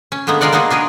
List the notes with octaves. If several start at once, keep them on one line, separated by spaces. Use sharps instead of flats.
C#4
D3 G#3 A#3 B3
G#3 A#3 F4 A#4 D5 F#5
A#3 B3 D#4 F#4 G#4
D4 F4 G#4 A#4 B4